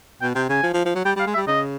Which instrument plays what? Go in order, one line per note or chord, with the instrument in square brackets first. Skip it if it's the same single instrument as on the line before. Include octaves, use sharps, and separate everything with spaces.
[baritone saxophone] B2 [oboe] G5
[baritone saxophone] C3 [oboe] G5
[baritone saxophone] C#3 [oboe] G#5
[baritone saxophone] F3
F3
F3
F#3
[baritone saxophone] G3 [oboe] G5
[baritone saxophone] G3 [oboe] F5
[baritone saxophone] G#3
[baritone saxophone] G3 [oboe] E5
[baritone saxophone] C#3 [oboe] D#5